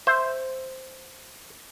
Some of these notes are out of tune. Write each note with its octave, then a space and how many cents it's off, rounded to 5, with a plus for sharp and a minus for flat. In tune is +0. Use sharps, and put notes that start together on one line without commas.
C5 +0 E5 +0